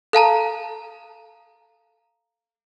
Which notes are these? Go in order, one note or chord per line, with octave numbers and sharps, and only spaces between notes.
A4 F5 A5 A#5